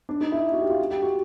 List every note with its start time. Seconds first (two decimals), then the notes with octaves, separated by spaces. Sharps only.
0.09 D4
0.21 D#4
0.32 E4
0.53 F#4
0.61 G4
0.70 F4
0.91 G4
1.02 F#4